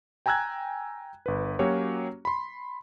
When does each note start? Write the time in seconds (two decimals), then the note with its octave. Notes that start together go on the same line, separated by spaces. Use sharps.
0.26 G5 G#5 A#5 E6 F#6 G#6
1.26 G1 B4
1.59 F#3 A#3 C#4 F#4 G4 C#5
2.25 B5 C6